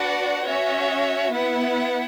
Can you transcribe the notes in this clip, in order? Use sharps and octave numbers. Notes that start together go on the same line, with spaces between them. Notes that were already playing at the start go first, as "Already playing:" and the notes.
Already playing: D4 F#4 B4 D5 F#5
C#4 F#4 C#5 E5
B3 E4 B4 F#5